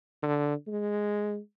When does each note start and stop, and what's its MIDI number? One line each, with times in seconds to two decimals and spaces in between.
0.23 0.54 50
0.67 1.39 56